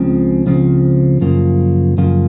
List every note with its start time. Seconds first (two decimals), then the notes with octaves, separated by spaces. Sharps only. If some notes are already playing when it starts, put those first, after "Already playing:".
Already playing: C#2 C#3 F3 C4
0.46 C#2 C#3 F3 C4
1.21 F#2 C#3 F3 A#3 F4
1.98 F#2 C#3 F3 A#3 F4